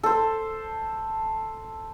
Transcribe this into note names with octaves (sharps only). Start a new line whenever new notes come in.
A4 C5